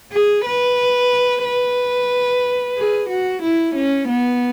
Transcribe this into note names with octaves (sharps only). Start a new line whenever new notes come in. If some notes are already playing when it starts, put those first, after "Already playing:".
G#4
B4
B4
G#4
F#4
E4
C#4
B3